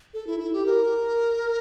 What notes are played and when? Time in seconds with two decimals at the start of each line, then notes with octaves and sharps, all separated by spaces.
0.14 A4
0.27 E4
0.40 E4
0.53 G4
0.66 A#4